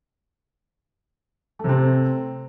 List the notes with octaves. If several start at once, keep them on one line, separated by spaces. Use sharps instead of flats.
C3 A3 C4